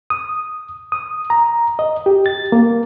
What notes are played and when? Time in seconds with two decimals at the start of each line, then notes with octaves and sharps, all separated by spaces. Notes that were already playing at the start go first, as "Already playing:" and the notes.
0.10 D#6
0.92 D#6
1.30 A#5
1.79 D#5
2.06 G4
2.26 A6
2.52 A#3